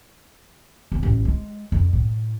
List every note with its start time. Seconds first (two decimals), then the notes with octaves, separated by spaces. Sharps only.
0.92 E2
1.03 A1
1.25 G#3
1.72 F2
1.93 A2